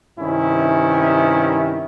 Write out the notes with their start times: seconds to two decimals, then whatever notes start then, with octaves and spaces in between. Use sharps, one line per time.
0.18 G2 C3 D#3 C#4 E4